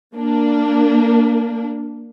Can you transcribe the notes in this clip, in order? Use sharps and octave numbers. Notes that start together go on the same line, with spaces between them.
A#3 D4